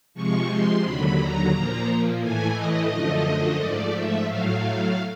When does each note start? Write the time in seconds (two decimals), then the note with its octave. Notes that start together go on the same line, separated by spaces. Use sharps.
0.14 C3 F3 G#3 C#6
0.49 C6
0.83 D#2 D3 F#3 B5
1.18 A#5
1.51 A#2 F3 A#3
2.20 A2 E3 A3 G#5
2.54 D#5
2.88 F#2 D3 F3 A3
3.57 G#2 F3 A3 D5
3.91 E5
4.25 A2 F#3 A3 F5